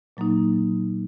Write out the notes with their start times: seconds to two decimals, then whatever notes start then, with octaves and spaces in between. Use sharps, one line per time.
0.17 A#2 F#3 A#3 D#4